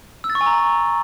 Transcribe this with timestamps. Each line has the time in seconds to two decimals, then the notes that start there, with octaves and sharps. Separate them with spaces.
0.24 E6
0.30 A6
0.35 C#6
0.41 G#5
0.46 A#5